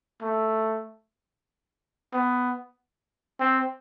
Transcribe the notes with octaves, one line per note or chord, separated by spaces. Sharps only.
A3
B3
C4